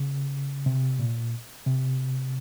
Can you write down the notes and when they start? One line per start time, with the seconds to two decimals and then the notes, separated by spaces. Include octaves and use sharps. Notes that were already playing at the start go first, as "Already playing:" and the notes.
Already playing: C#3
0.66 C3
0.99 A#2
1.66 C3